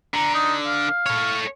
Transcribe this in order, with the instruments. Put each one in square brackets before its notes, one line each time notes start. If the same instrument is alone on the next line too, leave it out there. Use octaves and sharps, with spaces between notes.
[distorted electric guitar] D3 [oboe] A#5
[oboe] D#4
F5
[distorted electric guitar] A4 C#5